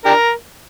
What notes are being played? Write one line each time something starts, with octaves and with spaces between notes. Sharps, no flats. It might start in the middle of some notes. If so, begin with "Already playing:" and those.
D4 G4 A#4